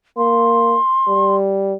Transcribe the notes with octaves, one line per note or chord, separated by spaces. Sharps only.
A#3 C6
G3